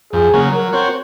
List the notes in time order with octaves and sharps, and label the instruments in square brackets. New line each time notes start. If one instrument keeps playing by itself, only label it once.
[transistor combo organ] F2 [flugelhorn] G#4
[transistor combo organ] C#3 F#3 A#3
[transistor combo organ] F#3 [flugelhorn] A#4
[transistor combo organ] C4 F#4 C#5